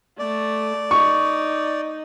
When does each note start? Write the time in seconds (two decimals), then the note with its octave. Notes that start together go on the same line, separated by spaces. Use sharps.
0.19 A3 D5
0.91 D#4 C#6